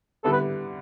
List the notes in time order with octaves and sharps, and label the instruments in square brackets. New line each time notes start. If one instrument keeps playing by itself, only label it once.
[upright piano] D3 G3 B3 E4 [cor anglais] A4
[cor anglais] B4